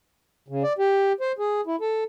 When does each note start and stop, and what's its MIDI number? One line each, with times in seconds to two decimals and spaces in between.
0.48 0.63 49
0.63 0.73 74
0.79 1.12 67
1.21 1.32 72
1.39 1.61 68
1.67 1.76 64
1.81 2.04 69